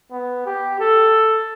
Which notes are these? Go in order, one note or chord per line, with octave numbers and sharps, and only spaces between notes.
B3
G4
A4